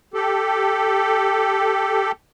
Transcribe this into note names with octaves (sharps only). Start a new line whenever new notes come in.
G4 A4